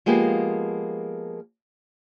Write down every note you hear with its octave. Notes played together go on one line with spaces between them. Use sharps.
F3 G#3 A#3 B3 G4